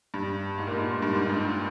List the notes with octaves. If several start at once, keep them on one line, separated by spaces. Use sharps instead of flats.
G2
G#2
A#2
G#2
G2
G#2
G2